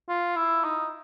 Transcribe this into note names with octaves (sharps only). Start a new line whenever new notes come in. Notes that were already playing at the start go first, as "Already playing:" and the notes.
F4
E4
D#4